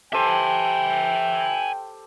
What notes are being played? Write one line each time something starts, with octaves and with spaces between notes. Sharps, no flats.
G4 A4 C5 E5 G5 G#5